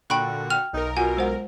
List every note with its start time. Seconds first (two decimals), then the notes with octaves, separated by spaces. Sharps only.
0.10 A#2 D3 F#4 G5 B5 C#6 F#6
0.50 G5 F6 F7
0.73 B1 D#4 A#4
0.97 B2 F4 F#5 G#5
1.17 G#3 C5 F#5